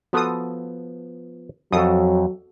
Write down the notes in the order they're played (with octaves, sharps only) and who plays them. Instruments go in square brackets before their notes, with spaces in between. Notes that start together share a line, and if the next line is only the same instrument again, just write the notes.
[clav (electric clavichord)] F3 B3 [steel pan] F#4 A4 D#6
[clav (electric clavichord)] F2 [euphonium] F#3 [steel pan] F#4 A4 D#6